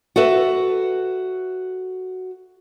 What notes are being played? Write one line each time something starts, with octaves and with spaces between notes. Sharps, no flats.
F#4 A4 B4 E5